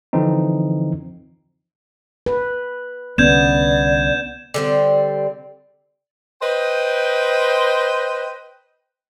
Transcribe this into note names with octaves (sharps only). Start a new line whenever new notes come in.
D3 E3 F3 C4 D#4
B4
C2 D3 B3 C#4 D5 G6 G#6 E7
D3 G3 C4
B4 C5 D#5 G5